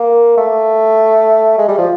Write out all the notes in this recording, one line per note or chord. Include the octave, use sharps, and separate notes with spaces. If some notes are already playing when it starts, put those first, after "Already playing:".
Already playing: A#3
A3
G#3
G3
F3